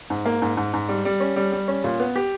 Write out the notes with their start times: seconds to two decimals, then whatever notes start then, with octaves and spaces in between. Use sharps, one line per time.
0.10 G#2
0.26 A#3
0.42 G#2
0.57 G#2
0.74 G#2
0.89 G3
1.05 G3
1.20 C#4
1.36 G3
1.52 G3
1.68 C#4
1.84 A#2
2.00 B3
2.16 G4